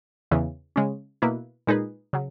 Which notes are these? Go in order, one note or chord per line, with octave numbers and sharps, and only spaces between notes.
E2 C#3 E3
C#3 G#3 C#4
B2 A#3 E4 B4
A#2 G#3 D#4 G#4 B4
C#3 F#3